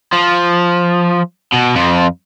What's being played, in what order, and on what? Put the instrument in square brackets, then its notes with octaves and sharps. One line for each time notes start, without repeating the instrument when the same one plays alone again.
[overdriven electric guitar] F3
B2
F2 F3